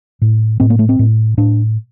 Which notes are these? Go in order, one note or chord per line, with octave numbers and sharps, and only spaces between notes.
A2
A2 C4
A#3
A3
C4
A2
A2 D4